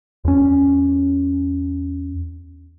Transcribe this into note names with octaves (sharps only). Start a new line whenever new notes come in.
E2 C#4